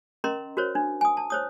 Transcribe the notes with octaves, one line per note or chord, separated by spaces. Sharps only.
C#4 A#4 D#5 A#5 C6
F#4 A#4 C5 C#5
D4
G#5 D#6
A5
C5 C#5 D#6